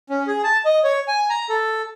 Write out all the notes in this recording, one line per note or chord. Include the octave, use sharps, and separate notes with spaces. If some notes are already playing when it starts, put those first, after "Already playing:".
C#4
G#4
A5
D#5
C#5
G#5
A#5
A4